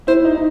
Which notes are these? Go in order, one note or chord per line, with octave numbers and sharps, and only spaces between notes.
E4 C5
D#4
D#4